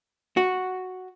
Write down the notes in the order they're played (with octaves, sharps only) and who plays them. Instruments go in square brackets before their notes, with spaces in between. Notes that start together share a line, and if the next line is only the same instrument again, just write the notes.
[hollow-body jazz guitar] F#4